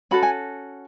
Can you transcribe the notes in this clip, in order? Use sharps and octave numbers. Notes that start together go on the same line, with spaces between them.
C#4 F#4 A4 B5
G#5